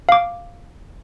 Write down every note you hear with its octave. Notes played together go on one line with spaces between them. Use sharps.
F5 D6